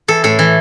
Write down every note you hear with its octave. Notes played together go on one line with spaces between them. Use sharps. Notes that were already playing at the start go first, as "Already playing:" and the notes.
E3 A4
A2 A4
E3